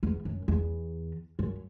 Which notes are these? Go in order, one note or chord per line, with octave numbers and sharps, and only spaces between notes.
E2
F#2
E2
F#2